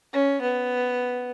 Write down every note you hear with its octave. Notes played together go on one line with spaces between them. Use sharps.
C#4
B3